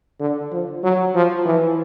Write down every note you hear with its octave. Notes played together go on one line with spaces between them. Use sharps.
D3
F3
F#3
F3
E3